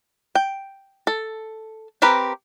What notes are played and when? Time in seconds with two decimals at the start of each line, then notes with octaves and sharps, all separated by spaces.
0.35 G5
1.07 A4
2.02 C4 G4 A#4 B4